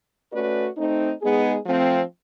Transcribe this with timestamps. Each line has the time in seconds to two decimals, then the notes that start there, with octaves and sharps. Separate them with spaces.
0.33 A3 C#4 F#4 B4 D5
0.78 A3 C4 D#4
1.22 G#3 B3 D#4 G#4
1.66 F3 A3 C4